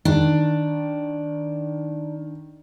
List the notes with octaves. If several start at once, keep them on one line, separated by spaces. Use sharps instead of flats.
D#3 D4